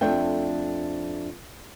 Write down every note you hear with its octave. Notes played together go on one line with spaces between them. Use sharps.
F2 A3 D4 E5 G5